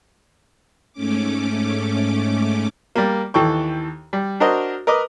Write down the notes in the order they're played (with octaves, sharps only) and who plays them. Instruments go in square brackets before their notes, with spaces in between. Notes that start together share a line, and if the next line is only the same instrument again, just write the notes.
[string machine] G#2 A3 C#4 D6
[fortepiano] G3 A#3
D#2 E3 A4 G5 C#6
G3
D4 F#4 A#4 C5 D#5
A#4 B4 D#5 D6